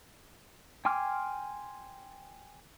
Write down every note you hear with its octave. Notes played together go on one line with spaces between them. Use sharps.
G5 G#5 C6 D6 F6